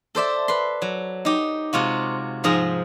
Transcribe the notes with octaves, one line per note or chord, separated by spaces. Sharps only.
A4 C5 D5 E5
B4 C6
F#3
D#4 G4
C3 G#3 F4 F#4
G#2 F3 G#4 A#5